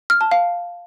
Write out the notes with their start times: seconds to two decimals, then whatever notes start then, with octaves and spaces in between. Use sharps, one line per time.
0.10 F6
0.21 A5
0.31 F5